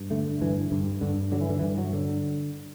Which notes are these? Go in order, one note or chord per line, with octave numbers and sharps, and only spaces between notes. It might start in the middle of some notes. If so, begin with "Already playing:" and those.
Already playing: G2
D3 A3
G2 E3
G2 D3
G2 D3
D3 F#3
E3
D3
E3
G2
F#3
D3